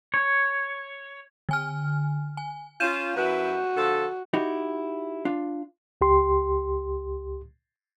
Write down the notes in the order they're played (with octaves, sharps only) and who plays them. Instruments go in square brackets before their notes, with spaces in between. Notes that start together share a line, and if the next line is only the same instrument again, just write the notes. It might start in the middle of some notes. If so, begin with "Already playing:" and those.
[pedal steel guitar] C#5
[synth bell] D3 G#5 F6
G#5
[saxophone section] C#4 F4 [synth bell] G6 D#7 E7
[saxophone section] F#2 E4 B4 [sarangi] F#4
[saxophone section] D3 F3 A4
[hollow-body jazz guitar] D#4 E4 F#4 G4
D4 F4
[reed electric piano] C#2 G4 C6